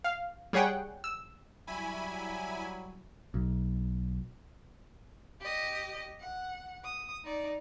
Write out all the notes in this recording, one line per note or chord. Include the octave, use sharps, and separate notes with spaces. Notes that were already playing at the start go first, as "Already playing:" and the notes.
F5
G3 G#4 C#5 F#5 G5
E6
F#3 G3 E4 G#5 B5
B1
G4 D#5
F#5
D#6
D#4 D5